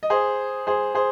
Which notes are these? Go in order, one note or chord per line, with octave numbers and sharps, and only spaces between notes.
D#5
G#4 C5
G#4 C5
G#4 C5